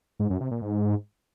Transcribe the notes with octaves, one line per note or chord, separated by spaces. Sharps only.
G#2
F#2
C3
A#2
G#2